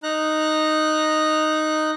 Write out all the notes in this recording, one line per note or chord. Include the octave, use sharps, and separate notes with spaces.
D#4 A#5 F#6